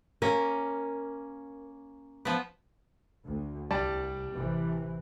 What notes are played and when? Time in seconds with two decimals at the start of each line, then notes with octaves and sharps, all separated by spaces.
0.22 A#3 C#4 A#4
2.25 F3 B3
3.26 D2
3.71 C2 G3 D5 A5
4.34 A1 C3 E3